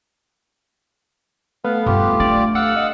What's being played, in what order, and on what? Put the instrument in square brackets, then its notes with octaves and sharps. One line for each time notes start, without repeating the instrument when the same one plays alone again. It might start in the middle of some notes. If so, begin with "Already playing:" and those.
[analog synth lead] A3 [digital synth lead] B3 [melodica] F5
[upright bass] G2 [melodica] F4 G4
[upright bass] D4 [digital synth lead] D5
[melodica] F5 E6 [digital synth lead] F#5
[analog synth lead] D#5